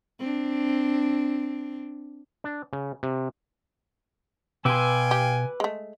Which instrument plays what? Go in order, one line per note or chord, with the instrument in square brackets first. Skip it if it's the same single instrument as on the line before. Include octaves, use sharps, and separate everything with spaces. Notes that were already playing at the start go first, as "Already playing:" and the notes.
[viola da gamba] C4 D4
[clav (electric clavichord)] D4
C#3
C3
[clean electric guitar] B2 C6 [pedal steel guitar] B4 D6 E6 [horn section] F5 G5 G#5
[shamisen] G4
G#3 A3